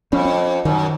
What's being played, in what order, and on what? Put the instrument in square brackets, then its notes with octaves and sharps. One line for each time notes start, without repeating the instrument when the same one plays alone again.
[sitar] F2 [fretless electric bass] C#4
[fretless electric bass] C#4
[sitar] F#2 [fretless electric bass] D#3